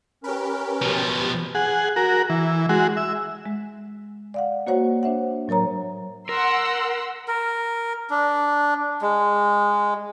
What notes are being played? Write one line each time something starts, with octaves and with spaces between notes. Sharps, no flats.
C#4 G4 A#4 B4
B2 F3
G#4 F#5
F#4 A#4
E3
G#3 F#4
E5
G#3
D5 F5 F#5
A#3 F#4 C5 C#5 F#5
D4 C5 E5 F#5
A2 F#3 A#4 C#5 A#5
A#4 F#5 C6 E6
A#4
D4
G#3